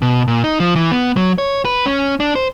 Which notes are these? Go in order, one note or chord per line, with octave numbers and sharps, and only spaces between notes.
B2
A#2
D#4
F3
E3
B3
F#3
C#5
B4
C#4
D4
C5